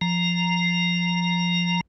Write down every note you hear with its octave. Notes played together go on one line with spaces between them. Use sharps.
F3 A#5